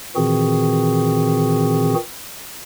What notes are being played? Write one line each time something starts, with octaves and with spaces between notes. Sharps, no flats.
A#2 D#3 E3 C4 F#4 G#4